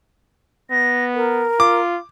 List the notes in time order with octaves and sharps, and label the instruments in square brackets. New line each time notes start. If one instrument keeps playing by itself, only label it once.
[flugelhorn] B3 [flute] A#6
[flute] A#4
[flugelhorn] F4 [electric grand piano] D6